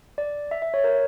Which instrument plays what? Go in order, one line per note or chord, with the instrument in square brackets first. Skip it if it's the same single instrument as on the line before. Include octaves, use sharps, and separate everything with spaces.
[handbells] D5
E5
E5
C#5
A#4